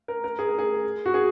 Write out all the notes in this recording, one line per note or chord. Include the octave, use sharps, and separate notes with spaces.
A#4
A#4
G#4
A#4
G#4
F#4
G#4